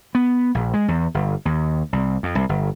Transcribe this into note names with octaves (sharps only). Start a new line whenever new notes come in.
B3
A#1
G#3
E2
G1
D#2
C2
F2
C2
G1